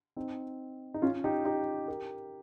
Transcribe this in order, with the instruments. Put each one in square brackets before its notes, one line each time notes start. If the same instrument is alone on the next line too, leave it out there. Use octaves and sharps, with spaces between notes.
[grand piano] C4 D#4
D#4
C#4 F4
D#4 G4
D#4 G4
G4 A#4